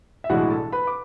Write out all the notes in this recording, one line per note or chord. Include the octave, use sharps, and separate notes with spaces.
E5
B1 A2 E3 G#3 D4 F#4 F#5
A4 A5
B4 B5
D6